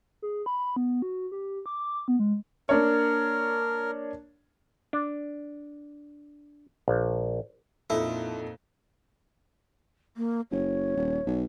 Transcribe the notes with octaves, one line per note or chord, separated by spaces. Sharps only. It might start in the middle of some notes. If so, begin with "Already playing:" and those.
G#4
B5
B3
F#4
G4
D6
B3
G#3
A#3 D4 A#4 C#5
D4
A#1
F2 A#2 D#4 E4 A4
A#3
F#1 C#5
D#1
B1